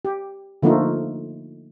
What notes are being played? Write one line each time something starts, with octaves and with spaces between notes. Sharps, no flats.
G4
D3 F3 A3 A#3 D#4 F4